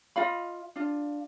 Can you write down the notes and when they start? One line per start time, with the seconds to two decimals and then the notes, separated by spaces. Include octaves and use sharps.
0.16 F4 D#5 F5 B5
0.76 D4 F4